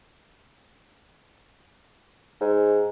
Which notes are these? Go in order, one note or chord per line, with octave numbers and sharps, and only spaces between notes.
G#2